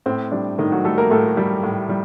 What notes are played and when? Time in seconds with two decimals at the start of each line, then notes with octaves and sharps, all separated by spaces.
0.06 A2 C4
0.32 G3 D4
0.59 A2 D#3 D#4
0.72 F#3 F#4
0.84 G3 A3 A4
0.98 A#3 A#4
1.11 A2 A3 A4
1.37 G3 G4
1.63 A2
1.89 G3